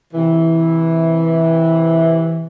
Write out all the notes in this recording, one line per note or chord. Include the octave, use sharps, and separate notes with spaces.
C3 E3